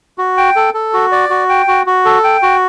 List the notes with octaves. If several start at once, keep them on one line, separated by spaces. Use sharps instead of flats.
F#4
G5
A4
A4
F#4
D5
F#4
G5
F#4
F#4
A4
G5
F#4